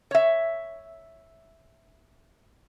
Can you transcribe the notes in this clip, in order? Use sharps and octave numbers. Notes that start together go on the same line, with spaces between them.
C#5 E5